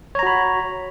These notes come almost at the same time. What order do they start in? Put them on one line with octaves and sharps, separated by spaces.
C#5 A#5 F#4 B5